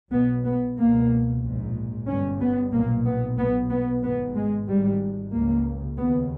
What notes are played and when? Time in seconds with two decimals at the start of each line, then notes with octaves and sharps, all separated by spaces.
0.12 B1 B2 B3
0.45 B3
0.77 C#2 B2 A#3
1.42 A#1 G#2
2.08 G1 G2 C#4
2.40 B3
2.73 B1 A#2 A#3
3.05 B3
3.38 B1 B2 B3
3.70 B3
4.03 G#1 G#2 B3
4.35 G#3
4.68 G#1 G#2 G3
5.33 C#2 C#3 A#3
5.98 D#2 C#3 B3